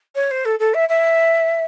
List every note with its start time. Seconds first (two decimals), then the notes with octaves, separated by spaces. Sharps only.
0.15 C#5
0.31 C5
0.45 A4
0.59 A4
0.74 E5
0.89 E5